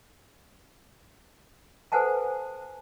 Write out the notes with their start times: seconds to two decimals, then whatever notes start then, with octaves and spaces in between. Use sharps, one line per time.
1.92 A4 B4 C5 F#5 G#5 A5